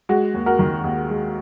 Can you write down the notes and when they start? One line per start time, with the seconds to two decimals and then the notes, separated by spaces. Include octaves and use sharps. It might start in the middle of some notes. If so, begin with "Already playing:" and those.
0.09 G#3 F#4
0.34 D#2
0.46 F#4 A#4
0.59 D#3
0.84 D#2
1.10 G#3